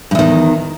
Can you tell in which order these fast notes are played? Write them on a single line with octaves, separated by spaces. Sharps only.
G2 E2 D#3